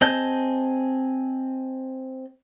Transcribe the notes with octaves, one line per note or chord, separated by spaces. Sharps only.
C4 G#4 D#5 A5 G6